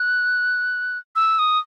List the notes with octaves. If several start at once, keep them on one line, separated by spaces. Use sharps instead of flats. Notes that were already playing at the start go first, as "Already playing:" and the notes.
Already playing: F#6
E6
D#6